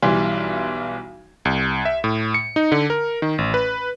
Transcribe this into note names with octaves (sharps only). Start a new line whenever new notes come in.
B1 E3 G3 C6
C2
E5
A2
C#7
D#4
D3
A#4
D#3
A1
B4